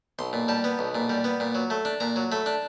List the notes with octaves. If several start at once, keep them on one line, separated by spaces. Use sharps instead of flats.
B1 C6
A#2
G3 A5
B3
B1
A#2
G3
B3
A#2
F#3
A3
D4
A#2 A#5
F#3
A3 B5
D4